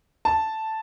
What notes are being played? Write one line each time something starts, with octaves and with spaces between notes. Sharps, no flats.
A5